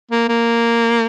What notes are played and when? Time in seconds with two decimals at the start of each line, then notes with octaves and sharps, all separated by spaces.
0.11 A#3
0.29 A#3